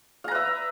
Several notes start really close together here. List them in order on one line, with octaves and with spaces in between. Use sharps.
F5 A#5 B4 E5